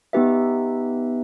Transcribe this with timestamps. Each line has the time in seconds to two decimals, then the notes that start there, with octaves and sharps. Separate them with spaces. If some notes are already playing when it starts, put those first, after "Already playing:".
0.13 B3 D#4 G4 B4 E5